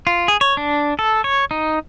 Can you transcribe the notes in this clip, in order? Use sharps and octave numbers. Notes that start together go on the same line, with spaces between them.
F4
G#4
C#5
D4
A4
C#5
D#4